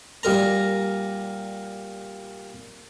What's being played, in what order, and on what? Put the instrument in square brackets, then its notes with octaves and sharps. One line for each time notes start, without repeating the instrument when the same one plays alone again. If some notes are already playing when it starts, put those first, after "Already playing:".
[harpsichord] A#2 G3 A#4 A#5